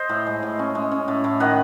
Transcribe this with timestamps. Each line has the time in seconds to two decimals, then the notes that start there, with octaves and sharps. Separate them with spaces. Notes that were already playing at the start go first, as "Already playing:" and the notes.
Already playing: C5 D#5
0.09 A2
0.26 G#3
0.43 A2
0.59 C#4
0.75 G#3
0.92 C#4
1.08 A2
1.24 A2
1.40 D#3 D#5 F#5